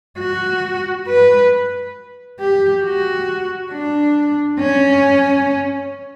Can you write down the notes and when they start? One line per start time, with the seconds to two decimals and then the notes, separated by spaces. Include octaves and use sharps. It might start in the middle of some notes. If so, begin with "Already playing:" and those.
0.19 F#4
1.07 B4
2.40 G4
2.84 F#4
3.72 D4
4.59 C#4